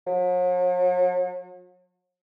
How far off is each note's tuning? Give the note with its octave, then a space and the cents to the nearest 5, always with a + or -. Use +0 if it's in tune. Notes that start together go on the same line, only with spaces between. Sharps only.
F#3 -45